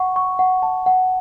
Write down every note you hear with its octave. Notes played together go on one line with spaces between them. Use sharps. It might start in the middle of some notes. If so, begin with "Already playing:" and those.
Already playing: F#5 C#6
C#6
F#5
A5
F#5